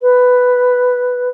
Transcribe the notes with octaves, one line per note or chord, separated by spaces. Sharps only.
B4